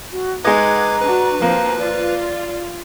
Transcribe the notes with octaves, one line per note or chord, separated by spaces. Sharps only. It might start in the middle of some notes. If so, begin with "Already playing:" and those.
F#4
G#3 D#4 B4 D#5 F#5 A#5 D6 G#6
D4 F#4 B4
F3 A#3 C4 A#5
F4 D5